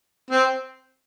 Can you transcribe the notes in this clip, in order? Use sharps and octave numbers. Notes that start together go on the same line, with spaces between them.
C4